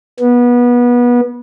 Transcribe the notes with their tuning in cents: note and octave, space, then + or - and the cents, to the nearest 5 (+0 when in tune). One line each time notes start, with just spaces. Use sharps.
B3 -25